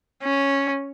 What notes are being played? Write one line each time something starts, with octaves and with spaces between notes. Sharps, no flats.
C#4